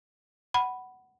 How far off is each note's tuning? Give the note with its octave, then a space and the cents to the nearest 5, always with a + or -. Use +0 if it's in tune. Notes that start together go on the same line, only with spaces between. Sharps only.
F#5 +15 B5 +0